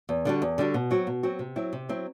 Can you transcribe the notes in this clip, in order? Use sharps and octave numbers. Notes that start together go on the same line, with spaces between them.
E2
D3 G3 D4 F#4
E2
D3 G3 D4 F#4
B2
F#3 C4 F#4
B2
F#3 C4 F#4
C3
F#3 C4 E4
C3
F#3 C4 E4